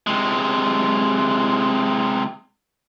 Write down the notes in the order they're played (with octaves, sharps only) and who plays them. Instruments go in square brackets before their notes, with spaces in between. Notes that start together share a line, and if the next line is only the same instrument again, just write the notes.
[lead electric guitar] C3 G#3